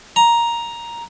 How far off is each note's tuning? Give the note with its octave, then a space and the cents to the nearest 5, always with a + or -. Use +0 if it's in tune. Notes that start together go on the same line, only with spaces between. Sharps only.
A#5 +5